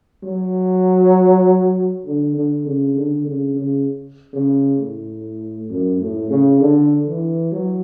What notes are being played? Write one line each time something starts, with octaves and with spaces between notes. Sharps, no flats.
F#3
D3
D3
C#3
D3
C#3
C#3
C#3
A2
F#2
A2
C#3
D3
E3
F#3